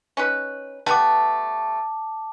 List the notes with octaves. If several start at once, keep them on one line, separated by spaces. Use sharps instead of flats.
C#4 D#4 B4
G3 A3 B3 A5 D6